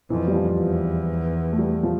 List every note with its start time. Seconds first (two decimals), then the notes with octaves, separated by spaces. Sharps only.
0.10 F2 E3
0.28 G3
0.34 F3
0.59 E2
1.53 A3
1.58 G3
1.83 F3